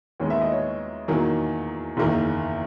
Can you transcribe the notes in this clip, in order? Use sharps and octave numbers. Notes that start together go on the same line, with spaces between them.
D#2 D#3 G#3 B3 C#5
E5
D#5
C#5
E2 D#3 F#3 A#3
F#1 E2 D#3 A#3